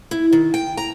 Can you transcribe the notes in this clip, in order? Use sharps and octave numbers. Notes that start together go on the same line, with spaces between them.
E4
D#3
G5
A#5